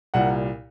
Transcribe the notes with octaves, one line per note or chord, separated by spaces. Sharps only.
C2 A#2 G3 F#5